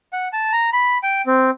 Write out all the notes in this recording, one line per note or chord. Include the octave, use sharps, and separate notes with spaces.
F#5
A5
A#5
B5
G5
C4